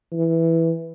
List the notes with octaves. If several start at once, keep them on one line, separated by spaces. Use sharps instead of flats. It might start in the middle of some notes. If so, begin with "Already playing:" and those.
E3